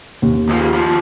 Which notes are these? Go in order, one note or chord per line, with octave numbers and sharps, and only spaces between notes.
D#2
C#2 F3
C2 F3